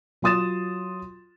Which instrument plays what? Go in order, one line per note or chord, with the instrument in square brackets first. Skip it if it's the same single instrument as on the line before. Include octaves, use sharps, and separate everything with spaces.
[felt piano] F#3 F4 C6 D#6 A6 E7